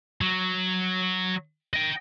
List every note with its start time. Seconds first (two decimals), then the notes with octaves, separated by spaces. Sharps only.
0.21 F#3
1.74 D#5 G5